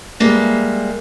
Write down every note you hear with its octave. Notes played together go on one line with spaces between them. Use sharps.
G3 G#3 A#3 E5